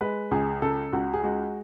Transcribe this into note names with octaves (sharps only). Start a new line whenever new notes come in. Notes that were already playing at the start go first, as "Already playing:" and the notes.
G#3 B4
C#2 G#4
C#3 A4
C#2 F#4
G#4
G#3 F#4